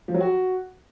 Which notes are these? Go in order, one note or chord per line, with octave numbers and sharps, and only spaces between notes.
F3
F#3
F#4